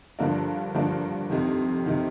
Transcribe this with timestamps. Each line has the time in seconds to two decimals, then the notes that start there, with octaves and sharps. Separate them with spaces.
0.19 G2 D3 F3 A#3 D4
0.74 G2 D3 F3 A#3 D4
1.30 F2 C3 D#3
1.86 C3 D#3